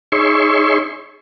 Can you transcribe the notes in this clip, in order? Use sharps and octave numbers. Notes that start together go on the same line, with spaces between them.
D#4 G#4 C#5 E5 C6 C#6